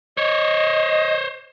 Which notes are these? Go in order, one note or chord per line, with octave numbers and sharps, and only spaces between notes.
C5 C#5 D#5